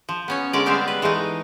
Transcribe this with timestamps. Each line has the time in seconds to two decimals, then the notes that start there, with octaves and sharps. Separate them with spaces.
0.09 F3
0.28 B3 C#4 C#5
0.53 D3 G#3 C#4 A#4 D5
0.66 G3 G#3 B3 C4 E5 F5
0.88 B4
1.02 E3 G#3 A3 D#4